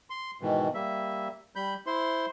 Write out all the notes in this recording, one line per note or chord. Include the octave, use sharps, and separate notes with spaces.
C6
G#2 B2 D#3 E3
G3 A#3 E5
G3 B5 G6
E4 C5 C6